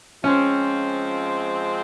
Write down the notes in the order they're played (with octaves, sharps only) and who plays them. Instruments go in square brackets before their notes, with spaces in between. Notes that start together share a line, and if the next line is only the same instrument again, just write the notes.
[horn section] F3 G#3 C4 [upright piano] C#4